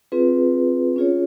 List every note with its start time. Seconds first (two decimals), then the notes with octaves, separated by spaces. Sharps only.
0.12 C4 F4 G#4 B4
0.96 C#4 F4 G#4 C#5